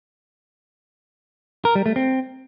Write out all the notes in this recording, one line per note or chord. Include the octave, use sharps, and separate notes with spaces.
A#4
G3
A3
C4